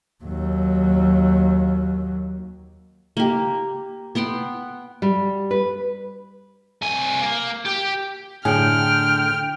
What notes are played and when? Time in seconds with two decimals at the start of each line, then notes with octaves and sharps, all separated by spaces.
0.24 D#2 F#3
3.17 A#3 G4
4.15 B3 F#5 G5 C6
5.02 G3
5.51 B4
6.82 C2 G#5
7.22 A#3
7.65 G4
8.45 A2 D3 G#4 G5 G#5 F6